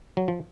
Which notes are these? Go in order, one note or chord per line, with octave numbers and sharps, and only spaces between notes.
F#3
F3